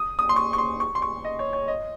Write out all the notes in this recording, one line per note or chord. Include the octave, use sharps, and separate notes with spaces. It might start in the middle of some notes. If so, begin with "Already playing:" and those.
Already playing: D#6
D#6
C6
C#6
C#6
C6
C#6
C6
C#6
D#5
C#5
C#5
D#5